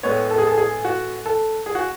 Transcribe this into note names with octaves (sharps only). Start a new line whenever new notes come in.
A2 G#3 B3 C#5
A4
G#4
A4
G#4
F#4
A4
G#4
F#4